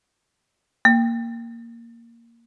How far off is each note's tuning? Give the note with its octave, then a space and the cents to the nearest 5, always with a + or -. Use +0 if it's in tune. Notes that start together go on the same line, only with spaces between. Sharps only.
A#3 -5